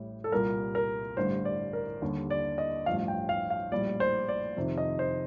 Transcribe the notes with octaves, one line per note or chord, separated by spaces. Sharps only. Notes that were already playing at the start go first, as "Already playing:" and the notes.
Already playing: A1 A2 G3
A4
C2 A#2 G3 A#4
A#4
A1 G2 D3 G3 C5
D5
A#4
D#2 D3 G3
D5
D#5
A1 G2 F3 F5
G5
F5
F5
A#1 A2 G3 D5
C5
D5
F2 C3 D#3
D#5
C5